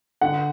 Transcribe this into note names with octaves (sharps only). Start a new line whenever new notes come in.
D3 F#5